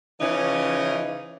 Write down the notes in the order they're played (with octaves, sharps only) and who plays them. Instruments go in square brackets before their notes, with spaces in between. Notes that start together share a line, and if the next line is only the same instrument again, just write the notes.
[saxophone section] C#3 E3 F3 C#4 D#4